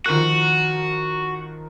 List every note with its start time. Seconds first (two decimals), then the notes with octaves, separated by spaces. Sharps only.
0.06 D#3 F3 F#4 A#4 F#6